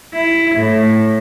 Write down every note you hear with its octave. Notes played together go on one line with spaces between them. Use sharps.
E4
A2